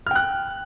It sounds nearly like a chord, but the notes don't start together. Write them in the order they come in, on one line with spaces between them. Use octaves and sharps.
F6 G5 F#6